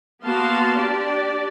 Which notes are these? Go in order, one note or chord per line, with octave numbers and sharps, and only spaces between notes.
A#3 B3 F#4 F5 A5 C6
D4 G4 D5